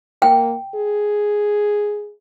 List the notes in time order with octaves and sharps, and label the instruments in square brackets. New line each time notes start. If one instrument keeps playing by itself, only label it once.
[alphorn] A#3 [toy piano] G5
[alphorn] G#4